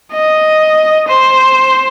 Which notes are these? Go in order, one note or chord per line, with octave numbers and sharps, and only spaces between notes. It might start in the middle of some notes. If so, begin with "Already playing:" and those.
D#5
C5